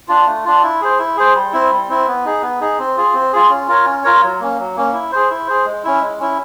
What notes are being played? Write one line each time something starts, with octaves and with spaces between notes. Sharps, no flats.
D4 F4
A3
D4 F4
E4
G#4 C5
E4
G#4 C5
G3
C4 E4
G3
C4 E4
B3
D#4 G#4
B3
D#4 G#4
C4
F4 G#4
C4
F4 G#4
C#4
F4 A#4 C#5
C#4
F4 A#4 C#5
F#3
A#3 C#4
F#3
A#3 C#4
E4
G#4 C5
E4
G#4 C5
G#3
C#4 E4
G#3
C#4 E4